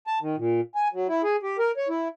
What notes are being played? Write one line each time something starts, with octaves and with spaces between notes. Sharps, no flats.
A5
D#3
A#2
G#5
F#3
E4
G#4
G4
A#4
C#5
E4